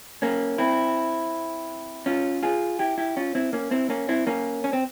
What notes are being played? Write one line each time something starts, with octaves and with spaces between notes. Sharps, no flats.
A#3 C#4
C4 E4
C#4 F4
F4 G#4
E4 G4
E4 G4
C#4 F4
C4 E4
A#3 C#4
C4 E4
A#3 C#4
C4 E4
A#3 C#4
C#4
C4